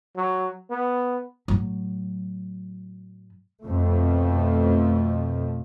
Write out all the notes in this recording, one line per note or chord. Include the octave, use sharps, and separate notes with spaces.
F#3
B3
A2 F#3
F2 B2 F3 A3